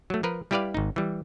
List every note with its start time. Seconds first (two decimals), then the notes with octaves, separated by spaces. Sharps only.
0.10 F#3 A3
0.23 F3 A#4 B4
0.51 G3 E4 G4 B4 D5 F5
0.74 G#1 D#4
0.96 E3 G3